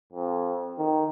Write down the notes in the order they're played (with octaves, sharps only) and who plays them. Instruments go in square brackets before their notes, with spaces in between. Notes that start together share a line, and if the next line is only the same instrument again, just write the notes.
[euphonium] F2
D#3